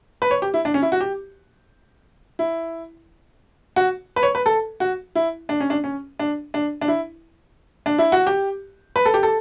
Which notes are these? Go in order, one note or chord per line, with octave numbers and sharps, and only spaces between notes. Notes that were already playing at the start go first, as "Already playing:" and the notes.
B4
C#5
G4
E4
D4
C#4
E4
F#4
G4
E4
F#4
B4
C#5
B4
A4
F#4
E4
D4
C#4
D4
C#4
D4
D4
D4
E4
D4
E4
F#4
G4
B4
A4
G4
A4